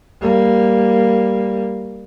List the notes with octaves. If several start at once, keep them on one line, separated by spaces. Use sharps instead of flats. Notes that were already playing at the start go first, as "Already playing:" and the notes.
G3 A#3